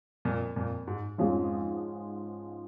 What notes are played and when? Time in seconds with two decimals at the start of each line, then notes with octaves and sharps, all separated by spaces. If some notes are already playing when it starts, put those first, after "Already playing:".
0.25 F2 A#2
0.56 F2 A#2
0.87 G#2
1.18 F2 G#2 F3 C#4 F4 G#4